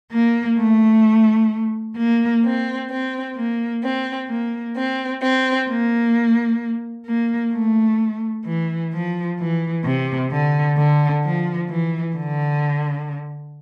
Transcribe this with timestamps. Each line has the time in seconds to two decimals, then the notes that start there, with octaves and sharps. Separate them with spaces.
0.12 A#3
0.59 A3
1.98 A#3
2.44 C4
2.90 C4
3.36 A#3
3.82 C4
4.28 A#3
4.75 C4
5.22 C4
5.68 A#3
7.06 A#3
7.53 A3
8.46 E3
8.92 F3
9.39 E3
9.84 C3
10.31 D3
10.76 D3
11.23 F3
11.69 E3
12.16 D3